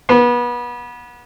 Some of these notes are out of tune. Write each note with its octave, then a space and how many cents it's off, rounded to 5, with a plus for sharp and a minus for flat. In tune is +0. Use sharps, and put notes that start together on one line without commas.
B3 -30